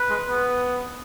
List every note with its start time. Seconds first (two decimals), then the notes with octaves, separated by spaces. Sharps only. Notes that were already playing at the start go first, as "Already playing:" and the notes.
Already playing: B4
0.10 G#3
0.30 B3